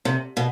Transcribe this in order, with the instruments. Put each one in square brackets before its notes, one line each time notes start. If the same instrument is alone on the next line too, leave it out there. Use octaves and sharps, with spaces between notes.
[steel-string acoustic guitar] C3
B2